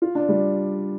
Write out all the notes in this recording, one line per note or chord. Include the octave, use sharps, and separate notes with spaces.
F4
D4
G3